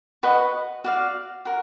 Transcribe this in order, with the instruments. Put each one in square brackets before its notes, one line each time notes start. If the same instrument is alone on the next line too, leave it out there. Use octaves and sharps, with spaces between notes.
[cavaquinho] F#4 B4 D#5 F#5
F#4 D5 F5
F#4 A#4